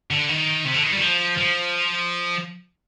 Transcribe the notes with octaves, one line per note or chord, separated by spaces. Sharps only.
D3
D#3
C3
D3
D#3
G3
D#3
F3
F3